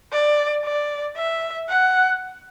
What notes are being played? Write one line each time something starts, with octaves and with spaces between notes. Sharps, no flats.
D5
D5
E5
F#5